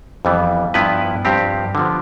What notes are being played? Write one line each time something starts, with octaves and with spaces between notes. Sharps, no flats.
F2 E3 G3 B3
G2 F3 B3 E4 B4
G2 F3 C4 G4
D3 F3 B3